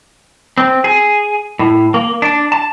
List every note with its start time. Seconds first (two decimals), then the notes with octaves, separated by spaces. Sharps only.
0.58 C4
0.84 G#4
1.59 A2
1.94 A#3
2.22 D4
2.52 A5